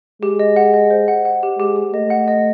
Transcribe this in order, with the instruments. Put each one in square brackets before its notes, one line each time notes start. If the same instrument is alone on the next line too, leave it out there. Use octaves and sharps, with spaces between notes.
[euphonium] G#3 [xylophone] G4
[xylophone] D#5
F#5
D#5
C5
F#5
F#5
G4
[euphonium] G#3 [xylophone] G4
[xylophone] G4
[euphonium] A3 [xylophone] D#5
[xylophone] F#5
D#5